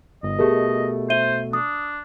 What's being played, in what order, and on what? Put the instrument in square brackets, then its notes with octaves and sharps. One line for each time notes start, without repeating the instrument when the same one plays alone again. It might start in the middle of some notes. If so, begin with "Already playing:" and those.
[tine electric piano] G1 [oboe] D#5
[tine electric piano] B2 A3 [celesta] G4 G#4 A#4
[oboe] C5 [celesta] E5 D#7 G7
[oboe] D4 [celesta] D#6